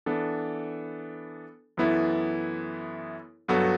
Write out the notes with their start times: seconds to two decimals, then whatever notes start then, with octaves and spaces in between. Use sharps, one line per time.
0.06 E3 B3 D4 A4
1.77 F#2 E3 B3 E4 A4
3.48 G2 F#3 B3 F#4 A4